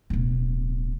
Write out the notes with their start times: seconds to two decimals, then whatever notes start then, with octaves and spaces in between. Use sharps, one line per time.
0.10 D1 B2